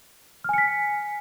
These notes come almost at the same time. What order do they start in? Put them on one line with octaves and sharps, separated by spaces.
F6 G#5 C#7 B6